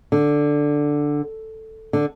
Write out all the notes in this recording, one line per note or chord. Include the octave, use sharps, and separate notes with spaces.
D3
D3